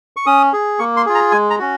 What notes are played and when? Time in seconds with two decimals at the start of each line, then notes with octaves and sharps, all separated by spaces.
0.17 C#6
0.26 C#4 D#6
0.53 G#4
0.79 A#3 C#6
0.97 C6
1.06 F4 G#4
1.15 A#5
1.32 G#3 G#5
1.50 A#5
1.59 C#4 F#4